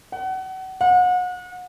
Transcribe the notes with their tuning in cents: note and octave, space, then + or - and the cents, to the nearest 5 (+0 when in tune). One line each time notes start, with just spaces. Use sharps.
F#5 +30
F#5 -35